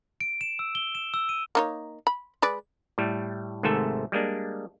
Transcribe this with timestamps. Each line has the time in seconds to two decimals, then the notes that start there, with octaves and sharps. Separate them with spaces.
0.21 D7
0.41 E7
0.59 E6
0.75 G7
0.95 E7
1.14 E6
1.29 D#7
1.55 A#3 D#4 C#5
2.07 B5
2.42 G#3 B4 D5
2.98 A2 G3 A3
3.63 G#1 G#2 C3 A3 A4 E5
4.12 G3 G#3 A#3 D4